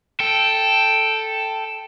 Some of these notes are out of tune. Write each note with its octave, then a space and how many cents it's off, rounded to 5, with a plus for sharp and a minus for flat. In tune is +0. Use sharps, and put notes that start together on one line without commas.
A4 +0 G5 +0